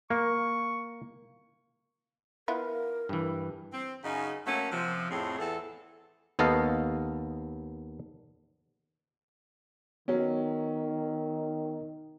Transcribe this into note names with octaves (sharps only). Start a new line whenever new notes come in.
A#3 C#6
B3 E4 F4 A#4
G2 E3
C4
F#2 C#3 D#4
F#3 A3 A#3 C#4
C3 F3
F2 A2 C4 G#4
E2 A4
D#2 B3 A4 D#5 F5
D#3 F#3 B3 C#4